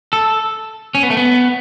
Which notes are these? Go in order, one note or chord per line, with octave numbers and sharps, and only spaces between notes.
A4
C#4
B3
A3
B3